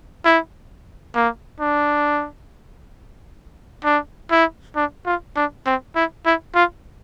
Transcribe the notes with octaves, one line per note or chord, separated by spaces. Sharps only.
E4
A#3
D4
D4
E4
D4
F4
D4
C4
E4
E4
F4